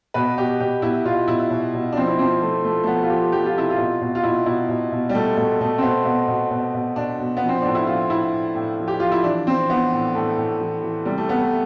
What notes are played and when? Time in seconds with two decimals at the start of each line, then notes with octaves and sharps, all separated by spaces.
0.14 B2 B4
0.38 B2 G4
0.60 B2 G4
0.82 B2 E4
1.05 B2 F4
1.28 B2 E4
1.50 B2
1.74 B2
1.92 D4
1.97 F3 C4
2.07 E4
2.19 F3 C4
2.42 F3 A3
2.64 F3 A3
2.83 A3
2.87 F3 B3
3.03 F4
3.10 F3 G4
3.32 F3 G4
3.45 F4
3.56 C3 E4
3.71 F4
3.78 B2
4.02 B2
4.15 F4
4.24 B2 E4
4.46 B2 E4
4.69 B2
4.92 B2
5.09 G3
5.15 B2 A3
5.37 B2 A3
5.61 B2 A3
5.78 C4
5.83 B2 B3
6.05 B2 B3
6.28 B2
6.51 B2
6.75 B2
6.96 B2 D4
7.20 B2
7.37 B3
7.43 F3
7.49 C4
7.62 A2 D4
7.75 E4
7.87 F3 F4
8.10 A2 E4
8.32 A2
8.55 A2
8.79 F3
8.88 G4
9.00 F3 F4
9.12 E4
9.24 E3 D4
9.47 E3 C4
9.69 E3 B3
9.93 A2
10.15 A2 A3
10.37 A2
10.60 E3
10.83 E3
11.05 C3 G3
11.18 A3
11.29 C3 B3
11.39 A3